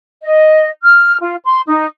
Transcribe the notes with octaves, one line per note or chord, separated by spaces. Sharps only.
D#5
F6
F4
C6
D#4